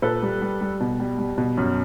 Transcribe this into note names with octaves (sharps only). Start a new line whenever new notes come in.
A#2 A4 B4
G3
G3
G3
B2
G3
G3
B2
F#2